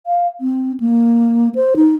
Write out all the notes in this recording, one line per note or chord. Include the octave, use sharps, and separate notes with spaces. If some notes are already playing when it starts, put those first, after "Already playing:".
F5
C4
A#3
C5
D#4